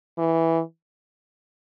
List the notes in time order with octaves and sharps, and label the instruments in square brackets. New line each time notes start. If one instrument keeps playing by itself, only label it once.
[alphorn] E3